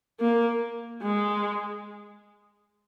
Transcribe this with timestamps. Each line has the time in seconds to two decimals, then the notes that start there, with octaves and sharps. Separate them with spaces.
0.20 A#3
1.02 G#3